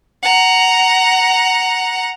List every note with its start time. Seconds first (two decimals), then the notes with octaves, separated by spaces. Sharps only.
0.22 F#5 A#5